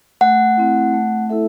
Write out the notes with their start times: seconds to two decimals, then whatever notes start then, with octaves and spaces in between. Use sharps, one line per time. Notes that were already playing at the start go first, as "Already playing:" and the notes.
0.21 A3 F#5
0.57 C4 E4
0.94 A3
1.29 E4 A4 E5